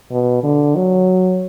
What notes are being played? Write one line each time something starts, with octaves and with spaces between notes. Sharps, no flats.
B2
D3
F#3